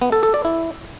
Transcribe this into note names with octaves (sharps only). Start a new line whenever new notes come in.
B3
A4
A4
D5
E4